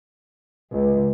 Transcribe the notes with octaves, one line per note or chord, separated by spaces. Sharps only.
C#2